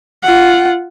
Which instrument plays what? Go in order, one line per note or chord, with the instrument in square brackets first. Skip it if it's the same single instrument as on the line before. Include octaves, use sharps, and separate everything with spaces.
[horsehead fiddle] F4 F#5